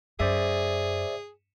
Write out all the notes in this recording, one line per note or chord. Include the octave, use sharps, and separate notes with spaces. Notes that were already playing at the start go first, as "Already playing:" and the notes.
F#2 G#4 C5 D5 E5